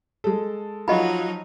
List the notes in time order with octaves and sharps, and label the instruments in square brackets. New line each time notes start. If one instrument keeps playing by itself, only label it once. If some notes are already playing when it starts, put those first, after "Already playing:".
[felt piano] G#3 A4
[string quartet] F3 F#3 D#4 [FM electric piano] F4 F#4 [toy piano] D#5 B5